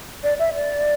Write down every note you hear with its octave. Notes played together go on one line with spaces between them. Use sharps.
D5
E5
D5